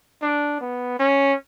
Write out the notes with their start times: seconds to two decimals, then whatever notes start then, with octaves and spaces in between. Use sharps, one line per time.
0.22 D4
0.61 B3
0.99 C#4